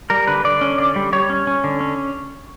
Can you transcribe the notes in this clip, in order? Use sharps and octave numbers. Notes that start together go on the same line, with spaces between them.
G3 A#4
D3 B4
D3 D5
C#4
D3 D5
G3
G3 C#5
C#4
C#4
D3
C#4